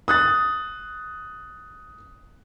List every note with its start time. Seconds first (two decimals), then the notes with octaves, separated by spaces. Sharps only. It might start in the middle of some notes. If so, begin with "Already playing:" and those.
0.08 D#6 F#6 A6